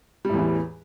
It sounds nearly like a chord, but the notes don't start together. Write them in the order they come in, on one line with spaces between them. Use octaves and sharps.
G3 A2 E2 E3